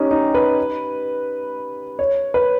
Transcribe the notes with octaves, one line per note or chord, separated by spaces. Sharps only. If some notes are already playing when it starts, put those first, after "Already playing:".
Already playing: C#4 D#4 G4
D#4
B4
C#5
B4